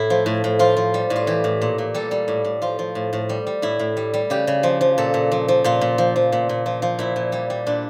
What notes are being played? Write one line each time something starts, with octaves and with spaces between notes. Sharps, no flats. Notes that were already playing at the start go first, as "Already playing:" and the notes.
Already playing: A2 E4
F3
A2
A2
F3 F4
F3
G3
A2
F4
E3 G4
A2
A#2
A#2
G3 A4
G3
A2
A2
F3 F4
F3
A2
A2
G3
G3
A2 E4
A2
G3
G3
C#3 G4
C#3
F3
F3
A#2 A4
A#2
F3
F3
A#2 F4
A#2
F3
F3
A#2
A#2
F3
F3
A#2 E4
A#2
G3
G3
A#2 D4